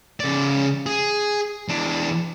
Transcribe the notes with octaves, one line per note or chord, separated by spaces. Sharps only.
C#3 D5
G#4
E2 D4